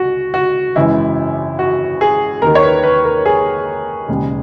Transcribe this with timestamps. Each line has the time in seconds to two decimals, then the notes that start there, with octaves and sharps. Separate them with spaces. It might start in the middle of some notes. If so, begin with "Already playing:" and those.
Already playing: C#2 F#4
0.34 F#4
0.76 G#1 F#2 C#3 E3 E4
1.59 F#4
2.01 G#4
2.42 D#2 D#3 A#4
2.55 C#5
2.63 B4
2.83 B4
3.05 A#4
3.25 G#4
4.08 E1 D#2 C#3